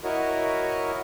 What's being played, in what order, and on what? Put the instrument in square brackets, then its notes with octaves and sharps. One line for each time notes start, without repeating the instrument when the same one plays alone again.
[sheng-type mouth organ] E4 F#4 A#4 C#5 D#5